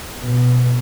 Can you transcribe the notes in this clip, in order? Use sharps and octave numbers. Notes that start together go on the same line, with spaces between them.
B2